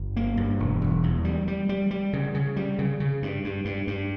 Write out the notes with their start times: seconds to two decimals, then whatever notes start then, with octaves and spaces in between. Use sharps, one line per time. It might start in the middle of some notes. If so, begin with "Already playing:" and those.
Already playing: G1
0.16 A#3
0.37 G2
0.60 E1
0.81 E1
1.04 E2
1.25 G3
1.48 G3
1.69 G3
1.91 G3
2.13 C#3
2.34 C#3
2.56 G3
2.79 C#3
3.00 C#3
3.22 G2
3.44 G2
3.65 G2
3.87 G2